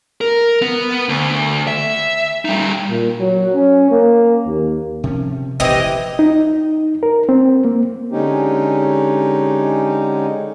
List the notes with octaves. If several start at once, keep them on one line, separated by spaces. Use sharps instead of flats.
A#4
B3
D2
E5
G3 D#4
A#2
F#3
C#4
A#3
D#2
C3 F3 C#4
F1 A#1 D#3 E3 C4 G4 D#5
D#4
A#4
C4
A#3
D3 G#3 C#4 D#4 G4